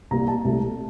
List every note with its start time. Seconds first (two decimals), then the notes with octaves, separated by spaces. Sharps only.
0.11 C2 A#2 G3 A#3 A#5
0.28 A5
0.45 C2 A#2 A3